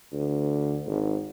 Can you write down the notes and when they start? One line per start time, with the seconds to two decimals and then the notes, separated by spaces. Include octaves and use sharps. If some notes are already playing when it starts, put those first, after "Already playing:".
0.13 D2
0.87 G#1